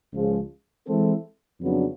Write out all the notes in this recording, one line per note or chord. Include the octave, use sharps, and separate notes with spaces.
C#2 C#3 F3 G#3
E3 G#3 C4 E4 A4
F2 C#3 F#3 B3 D4